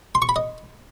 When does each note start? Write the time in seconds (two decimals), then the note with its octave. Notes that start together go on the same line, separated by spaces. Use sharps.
0.15 C6
0.22 C#6
0.29 B5
0.36 D#5